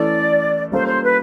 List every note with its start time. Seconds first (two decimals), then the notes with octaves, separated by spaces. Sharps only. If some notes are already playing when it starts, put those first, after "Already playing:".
Already playing: E3 A3 C#4 E4 A4 D5
0.72 G3 A#3 C#4 F4 A4 C5
0.87 C5
1.02 B4